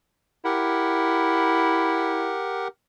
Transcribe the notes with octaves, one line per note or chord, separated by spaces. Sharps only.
E4 G4 A#4 F#5